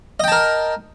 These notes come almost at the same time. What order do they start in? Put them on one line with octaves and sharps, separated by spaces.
D#5 G5 A5 A#4